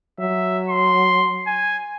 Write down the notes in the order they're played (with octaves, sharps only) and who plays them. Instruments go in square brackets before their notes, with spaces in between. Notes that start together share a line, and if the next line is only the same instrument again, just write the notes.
[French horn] F#3 [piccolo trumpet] E5
[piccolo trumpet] C6
G#5